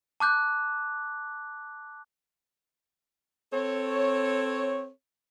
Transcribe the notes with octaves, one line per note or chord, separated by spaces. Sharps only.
A5 D6 F#6 G6
C4 A4 C#5